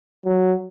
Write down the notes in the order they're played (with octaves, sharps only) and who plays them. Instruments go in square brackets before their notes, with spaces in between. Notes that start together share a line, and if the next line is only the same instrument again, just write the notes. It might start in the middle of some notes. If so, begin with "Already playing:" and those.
[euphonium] F#3